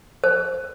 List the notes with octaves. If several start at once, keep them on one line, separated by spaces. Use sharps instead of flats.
C5